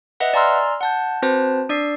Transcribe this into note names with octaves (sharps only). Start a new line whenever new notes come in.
B4 D#5 E5 F#5
D5 G#5 A#5 C6 E6 F6
F#5 A5 G6
C4 F#4 B4 C5 A5
D4 D5 E6 C7